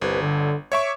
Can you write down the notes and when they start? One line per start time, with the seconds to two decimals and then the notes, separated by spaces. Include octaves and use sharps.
0.02 G1 C2 B4
0.21 D3
0.72 C#5 E5 C#6 D6